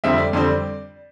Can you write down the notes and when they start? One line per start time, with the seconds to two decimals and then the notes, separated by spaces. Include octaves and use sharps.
0.04 F2 D3 G3 C4 E5
0.18 D5
0.33 F2 D3 G3 C4 D5